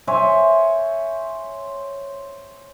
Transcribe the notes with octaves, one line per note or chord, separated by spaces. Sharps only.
C5 C#5 E5 G#5